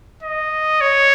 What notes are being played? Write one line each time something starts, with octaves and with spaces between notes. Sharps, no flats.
D#5
C#5